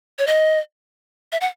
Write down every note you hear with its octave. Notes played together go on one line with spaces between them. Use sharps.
C#5
D#5
E5
F#5